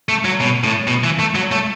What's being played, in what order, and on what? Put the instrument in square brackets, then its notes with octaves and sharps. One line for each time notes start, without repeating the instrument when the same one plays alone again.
[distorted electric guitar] A3
F#3
B2
A2
B2
E3
A3
F#3
A3